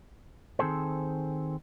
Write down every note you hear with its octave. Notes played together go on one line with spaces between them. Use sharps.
D#3 C4 G#4 A4 C5